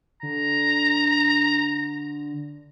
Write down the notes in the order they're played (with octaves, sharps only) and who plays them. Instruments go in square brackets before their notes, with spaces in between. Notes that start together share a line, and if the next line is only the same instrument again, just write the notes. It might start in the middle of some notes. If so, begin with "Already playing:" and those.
[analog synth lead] D3 [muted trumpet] A#5